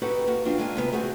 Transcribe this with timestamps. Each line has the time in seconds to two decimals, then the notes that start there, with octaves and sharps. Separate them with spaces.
0.02 D#4 E4 F#4 G4 A4 B4
0.27 A#3 F#4
0.45 F3 C4 D4 F4
0.58 G#3 A#3 D4 F4 G#5
0.77 C3 D#3 B3
0.92 A3 C4 F#4 G#4